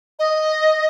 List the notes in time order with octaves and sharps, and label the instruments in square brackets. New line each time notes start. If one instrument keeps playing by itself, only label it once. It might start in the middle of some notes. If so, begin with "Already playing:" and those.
[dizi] D#5